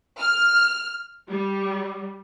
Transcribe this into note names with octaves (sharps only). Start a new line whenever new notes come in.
F6
G3